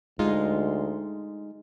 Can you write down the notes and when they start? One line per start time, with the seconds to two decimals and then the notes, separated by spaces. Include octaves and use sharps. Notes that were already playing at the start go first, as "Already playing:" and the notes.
0.19 D2 G#3 D#4 F4